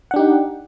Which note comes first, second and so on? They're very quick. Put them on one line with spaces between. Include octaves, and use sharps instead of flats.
F#5 D4 G4 D#4